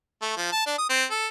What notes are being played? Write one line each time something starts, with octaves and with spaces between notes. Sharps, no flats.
A3
F3
A5
D4
D#6
C4
A4